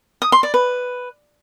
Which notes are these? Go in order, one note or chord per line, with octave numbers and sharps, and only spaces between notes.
D#6
C6
D5
B4